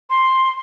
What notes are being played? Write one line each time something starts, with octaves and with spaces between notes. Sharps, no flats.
C6